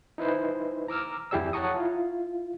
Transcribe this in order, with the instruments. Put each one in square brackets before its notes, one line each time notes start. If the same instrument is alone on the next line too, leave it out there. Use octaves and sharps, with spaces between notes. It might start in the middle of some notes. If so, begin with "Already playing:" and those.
[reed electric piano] D#4 E4 B4 C5
A#5 D6 E6 F6
F2 E4 G4 G#4 D5 E6
C#5 F#5 A5 A#5 C#6 D#6
E4 F4